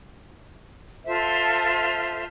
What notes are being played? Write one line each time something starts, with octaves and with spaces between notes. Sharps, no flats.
F4 A4 C5 E5